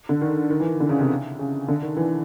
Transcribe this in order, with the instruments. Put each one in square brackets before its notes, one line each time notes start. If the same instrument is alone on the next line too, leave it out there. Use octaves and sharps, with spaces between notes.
[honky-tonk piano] D3
D#3
D#3
E3
D#3
D3
C#3
C3
C#3
D3
D#3
E3